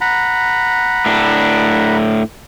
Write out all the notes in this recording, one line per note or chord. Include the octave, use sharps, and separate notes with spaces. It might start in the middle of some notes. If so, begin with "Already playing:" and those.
F#5 A#5 B5
A2 D4